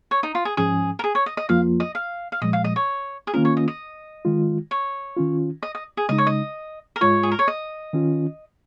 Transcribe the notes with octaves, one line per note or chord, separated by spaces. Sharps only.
C#5
D#4
F4
G#4
G#2 F3 C#4 G#4
A#4
G#4
C#5
D#5
D#5
F2 F3 A#3 F4 F5
D#5
F5
F5
A#2 F3 G#3 D#5
F5
D#5
C#5
G#4
D#3 A#3 C#4 F4 A#4
C#5
D#5
D#5
D#3 G#3 F4
C#5
D#3 C#4 F4
D#5
D#5
G#4
C#3 G#3 D#4 D#5
C#5
D#5
A#4
G#2 G#3 F4 C#5
G#4
A#4
C#5
D#5
D#3 C#4 F4